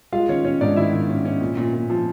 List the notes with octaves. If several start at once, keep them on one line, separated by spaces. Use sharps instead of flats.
G#3 F4 F5
D#3 C#4 C#5
C#4 C#5
G#2 D4 D5
D#3 E4 E5
D#3
C#4
C#4
A#2
A#2
A#2
F3